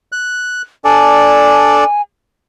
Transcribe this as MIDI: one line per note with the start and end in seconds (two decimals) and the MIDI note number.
0.12 0.62 90
0.85 1.84 62
0.85 1.84 69
0.85 1.84 74
0.85 2.01 80